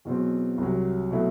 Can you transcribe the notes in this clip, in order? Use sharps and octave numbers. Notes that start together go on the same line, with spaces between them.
E2 B2 F#3 C4
C2 C3 F#3
B2 F#3 A3 E4